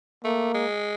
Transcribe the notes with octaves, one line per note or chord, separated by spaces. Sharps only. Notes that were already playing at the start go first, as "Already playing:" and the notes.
A3 A#3
G#3